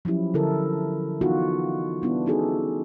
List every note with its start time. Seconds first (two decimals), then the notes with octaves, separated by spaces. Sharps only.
0.05 F3 F#3 C#4 E4 G4
0.34 D3 E4 A4 A#4
1.21 E3 B3 D#4 F4 F#4
2.02 G3 B3 D4 E4
2.26 B3 C#4 D#4 F#4 G#4 A4